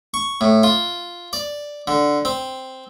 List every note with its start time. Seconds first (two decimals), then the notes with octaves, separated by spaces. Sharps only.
0.14 C#6
0.41 A2
0.63 F4
1.33 D5
1.87 D3
2.25 C4